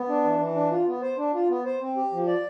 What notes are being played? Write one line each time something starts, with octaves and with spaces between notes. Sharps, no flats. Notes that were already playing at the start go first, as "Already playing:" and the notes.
Already playing: B3
D4
E3
E3
D4
F4
B3
C5
D4
F4
B3
C5
C4
G4
F3
D5